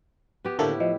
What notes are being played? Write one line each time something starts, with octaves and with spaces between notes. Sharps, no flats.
B3 G4
A2 D3 A#3 E4 G4 A4
F3 D#5